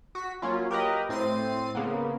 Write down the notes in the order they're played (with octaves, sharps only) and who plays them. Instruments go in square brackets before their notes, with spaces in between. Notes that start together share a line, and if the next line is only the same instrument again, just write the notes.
[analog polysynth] F#4 B6
F#3 A#3 C#4 F4
G4 A#4 B4 D#5
A2 C4 A6 C7 D#7
C#3 A#3 B3